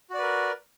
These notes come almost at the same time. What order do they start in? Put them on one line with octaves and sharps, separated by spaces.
F#4 D5 B4 A#4